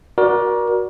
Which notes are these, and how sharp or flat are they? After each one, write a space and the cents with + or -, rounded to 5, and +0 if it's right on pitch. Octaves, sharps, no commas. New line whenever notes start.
F#4 +0 A#4 +25 D5 +0